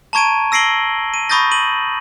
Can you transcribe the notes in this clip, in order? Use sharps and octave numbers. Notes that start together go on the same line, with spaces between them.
A5 A#5 C#6 G#6 D7 D#7
E6 A#6 C7 D7 F#7 G7
D#7
B5 C#6 D#6 G6 A6 A#6
D#7 F#7